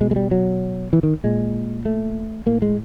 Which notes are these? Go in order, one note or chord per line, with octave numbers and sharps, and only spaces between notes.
B2 G#3
G#3
G3
F#3
E3
D#3
A#2 G#3
A3
A2 A#3
G#3